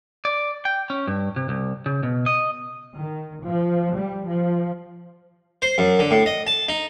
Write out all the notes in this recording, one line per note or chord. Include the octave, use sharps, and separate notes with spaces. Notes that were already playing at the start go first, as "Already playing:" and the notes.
D5
G5
C#4
G2
C3
C2
C#3
B2
D#5
D#3
F3
G3
F3
C5
F#2
D3
A2
D#5
A5
D#4